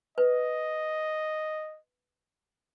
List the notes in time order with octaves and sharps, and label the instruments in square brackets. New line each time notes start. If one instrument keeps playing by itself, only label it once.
[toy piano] B4 [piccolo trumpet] D#5